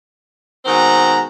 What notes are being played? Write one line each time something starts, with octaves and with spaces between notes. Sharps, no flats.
G#2 B2 D#3 C4 F#5 A#5